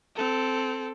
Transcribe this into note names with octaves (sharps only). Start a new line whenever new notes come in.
C4 A4